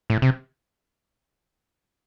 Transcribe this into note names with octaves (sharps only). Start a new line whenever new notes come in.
A2
C3